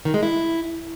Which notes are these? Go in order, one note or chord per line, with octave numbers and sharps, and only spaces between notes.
D#3
G#3
E4